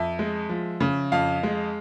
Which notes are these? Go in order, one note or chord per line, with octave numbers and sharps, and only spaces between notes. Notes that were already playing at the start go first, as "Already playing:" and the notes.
Already playing: F2 E5
G#3
F3
C#3
F2 F5
G#3